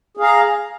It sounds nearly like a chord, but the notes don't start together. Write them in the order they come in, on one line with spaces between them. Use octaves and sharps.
G#4 F5 A#5